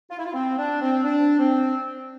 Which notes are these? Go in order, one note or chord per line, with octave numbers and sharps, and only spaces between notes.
F4
E4
F4
C4
D4
C4
D4
C4